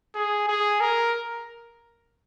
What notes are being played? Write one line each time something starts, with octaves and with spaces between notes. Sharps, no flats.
G#4
G#4
A#4